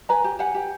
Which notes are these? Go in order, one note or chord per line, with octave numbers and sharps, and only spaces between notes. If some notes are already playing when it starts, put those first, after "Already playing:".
B4 G#5 A#5
G4
G4 F#5 G#5
G4